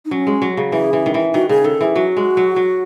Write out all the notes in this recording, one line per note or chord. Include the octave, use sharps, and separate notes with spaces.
D#4
F#3 C#4
G#3
F#3
C#3
E3 G#4
E3
D#3
E3
D#3 F#4
C#3 G#4
D#3 A4
E3 G#4
F#3 F#4
G#3
F#3
F#3